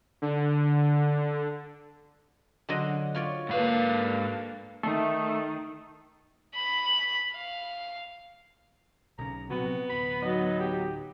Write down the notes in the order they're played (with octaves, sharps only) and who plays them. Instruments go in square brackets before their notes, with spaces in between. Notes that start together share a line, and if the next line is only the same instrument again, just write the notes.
[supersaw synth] D3
[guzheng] D3 F#3 D#5 [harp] F#5 C6 D7
[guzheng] F4 C#5 D5
[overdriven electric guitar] G#2 F5 [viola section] A#3 D4 A4 [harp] B4 B5
[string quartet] D#3 [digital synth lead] A3
[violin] B5
F5
[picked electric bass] B1 C#3 [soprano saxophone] A#5
[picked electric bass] A#1 C3 F#3 [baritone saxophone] B3 [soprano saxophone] F#4
[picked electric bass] D1 [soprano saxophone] B5
[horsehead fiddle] F#3 D#4 [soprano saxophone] D#5
[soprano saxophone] G4